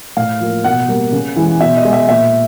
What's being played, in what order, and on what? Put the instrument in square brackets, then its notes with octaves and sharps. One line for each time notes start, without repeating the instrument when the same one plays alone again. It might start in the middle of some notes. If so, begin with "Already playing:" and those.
[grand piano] A2 F5
F3 A#3
B2 F#5
G3 A#3
C#3
E3 G#3
B2 E5
D#5
G#3
E5
A#2 E5